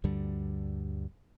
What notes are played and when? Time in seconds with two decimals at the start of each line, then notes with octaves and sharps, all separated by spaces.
0.04 D2 G2 D3 G3